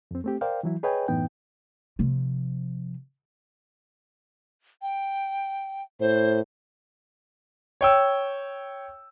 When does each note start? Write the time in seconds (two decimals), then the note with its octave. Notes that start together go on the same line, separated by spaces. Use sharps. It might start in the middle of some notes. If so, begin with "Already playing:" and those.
0.11 F2 C4
0.24 A3 C4 G4
0.41 A#4 C5 D5 F5 G5
0.63 E3 F#3 E4
0.83 G#4 B4 C#5 D#5 G5 G#5
1.08 F#2 A2 E3 B3 D#4 G5
1.99 C3 F3
4.82 G5
6.00 A2 C5
7.81 C#5 G5 E6